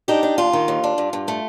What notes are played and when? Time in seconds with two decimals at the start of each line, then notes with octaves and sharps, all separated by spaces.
0.08 D4 D#4 G4
0.23 D4
0.38 D#2 F4
0.53 D#3
0.68 D#2
0.84 D4
0.98 G2
1.13 G2
1.28 A3